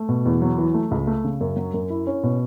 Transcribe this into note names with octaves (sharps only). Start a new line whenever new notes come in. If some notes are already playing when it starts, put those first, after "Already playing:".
Already playing: A3
B2
E2
F#3
E3
A3
C#2
A3
C#3
F#2
F#3
F#2
E4
C#4
B2